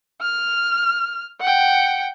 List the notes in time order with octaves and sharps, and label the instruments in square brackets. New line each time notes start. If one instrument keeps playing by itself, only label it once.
[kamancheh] F6
F#5 G5